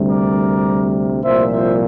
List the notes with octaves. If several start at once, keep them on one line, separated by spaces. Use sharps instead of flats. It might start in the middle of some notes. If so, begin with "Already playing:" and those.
Already playing: D2 C3 G3
A#4 D5
C2 A#2 F3 C5 E5
C5 E5